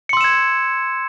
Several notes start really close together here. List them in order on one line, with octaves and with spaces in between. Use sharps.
C#7 C6 E6 E7 G#6